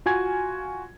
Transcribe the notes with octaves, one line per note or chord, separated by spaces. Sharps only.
F4 F#4 G#5 G#6